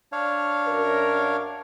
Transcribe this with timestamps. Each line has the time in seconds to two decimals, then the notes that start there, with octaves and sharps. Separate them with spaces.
0.12 D4 C#5 F5
0.66 F#2 A#4